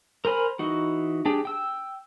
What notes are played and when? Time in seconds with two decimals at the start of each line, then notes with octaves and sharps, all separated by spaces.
0.25 A#4 C5 G#5 B5 F6
0.59 E3 D#4 F#4
1.25 D4 G4 G#4 G5
1.45 G5 E6